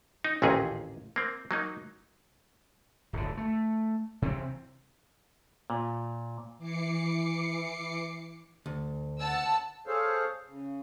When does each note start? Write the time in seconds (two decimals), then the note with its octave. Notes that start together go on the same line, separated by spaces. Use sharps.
0.24 D#4
0.42 A1 D#2 A#2 C4 C#4 G#4
1.16 A#3 C4
1.51 F#3 A#3 D#4
3.13 D1 G1 D3
3.37 A3
4.22 C3 E3 A3 C4
5.70 A#2
6.58 E3 D6 C7 C#7
8.66 D2
9.21 F#5 A5 E6
9.87 G#4 A4 C5 C#5 F5
10.48 C#3